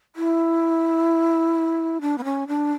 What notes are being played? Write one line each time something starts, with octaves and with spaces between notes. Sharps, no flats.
E4
D4
B3
C#4
D4